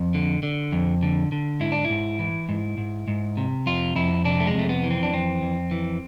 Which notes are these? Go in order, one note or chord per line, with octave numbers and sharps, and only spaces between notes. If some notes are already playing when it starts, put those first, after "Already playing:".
Already playing: F2
D3
D3
F2
D3
D3
G#2 E4
D4
E4
G#2
E3
G#2
G#2
G#2
C3
F2 F4
F2 E4
C3 D4
A3
G#3
F2 A3
B3
E3
C4
D4
F2 C4
F2
E3